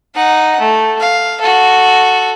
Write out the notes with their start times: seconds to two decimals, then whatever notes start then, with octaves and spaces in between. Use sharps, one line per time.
0.15 D#4 F#5
0.60 A3
1.00 F5
1.41 F#4 A4